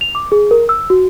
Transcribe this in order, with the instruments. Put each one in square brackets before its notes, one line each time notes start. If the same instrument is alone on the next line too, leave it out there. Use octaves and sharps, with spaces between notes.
[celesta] F7
D6
G#4
A#4
E6
F#4